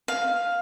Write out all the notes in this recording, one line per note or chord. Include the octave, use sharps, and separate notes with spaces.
F5